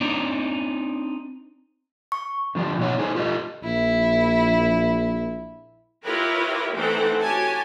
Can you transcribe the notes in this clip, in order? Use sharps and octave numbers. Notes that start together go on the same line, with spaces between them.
C4 D4 D#4 D5
C#6
D3 F3 D4 G4
B2 D#3 D#4 F#4 C#5 F#5
D#4 G#4 A4 C5
F4 G4 A4 D#5
A#1 E4
E4 F4 G4 A#4 B4 C#5
E3 A3 C4 D#4 A4 F#5
F#4 G4 C#5 G#5 A5